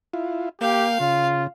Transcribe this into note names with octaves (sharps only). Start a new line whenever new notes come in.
E4 F4
A#3 G4 F5 G5
C#3 F4